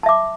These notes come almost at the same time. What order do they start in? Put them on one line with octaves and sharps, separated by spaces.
A5 E5 D6